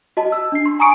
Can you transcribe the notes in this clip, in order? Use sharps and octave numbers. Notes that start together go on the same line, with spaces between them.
F#4 D#5 A5
E6
D4 C7
C6
G#5 A#5 C#6 D#6 C#7 D7